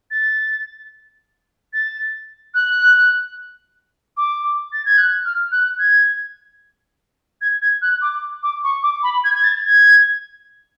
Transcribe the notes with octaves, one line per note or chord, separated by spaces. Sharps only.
A6
A6
F#6
D6
A6
G#6
F#6
F6
F#6
G#6
G#6
G#6
F#6
D6
D6
C#6
D6
B5
G#6
G#6
A6
G#6